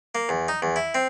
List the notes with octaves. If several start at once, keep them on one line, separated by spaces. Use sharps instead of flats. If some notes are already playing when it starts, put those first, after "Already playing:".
A#3
E2
D#4
E2
E4
C4